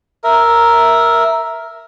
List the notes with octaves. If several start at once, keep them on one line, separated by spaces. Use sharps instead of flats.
A#4 E5